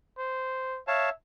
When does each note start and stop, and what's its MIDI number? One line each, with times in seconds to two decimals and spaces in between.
0.18 0.79 72
0.88 1.10 73
0.88 1.13 76
0.88 1.10 77
0.88 1.10 81